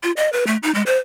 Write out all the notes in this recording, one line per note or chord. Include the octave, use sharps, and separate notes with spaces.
F4
D#5
B4
A3
D#4
G#3
C5